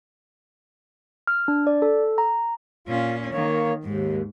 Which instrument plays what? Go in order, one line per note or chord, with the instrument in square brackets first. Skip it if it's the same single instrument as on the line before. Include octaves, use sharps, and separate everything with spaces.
[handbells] F6
D4
D5
A4
A#5
[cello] A#2 C#4 [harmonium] F4
[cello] D#3 [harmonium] A#3 C#5
[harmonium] D#2 [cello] G#2